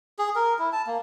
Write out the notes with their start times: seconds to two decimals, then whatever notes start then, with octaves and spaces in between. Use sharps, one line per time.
0.19 G#4
0.35 A#4
0.59 E4
0.73 A5
0.87 A#3